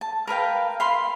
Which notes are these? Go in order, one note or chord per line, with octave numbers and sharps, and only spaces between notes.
A5
A#4 B4 F5 G5
F5 B5 C6